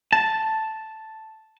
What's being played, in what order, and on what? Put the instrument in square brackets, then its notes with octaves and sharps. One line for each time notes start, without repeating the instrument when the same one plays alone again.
[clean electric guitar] A5